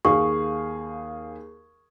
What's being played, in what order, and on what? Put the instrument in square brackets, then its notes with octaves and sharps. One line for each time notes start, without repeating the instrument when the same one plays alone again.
[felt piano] D#2 G#4 F5 [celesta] C#6